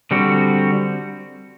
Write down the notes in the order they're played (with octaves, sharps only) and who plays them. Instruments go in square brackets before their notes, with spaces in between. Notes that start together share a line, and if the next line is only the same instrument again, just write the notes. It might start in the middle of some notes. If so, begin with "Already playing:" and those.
[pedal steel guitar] D3 G3 C4 F#4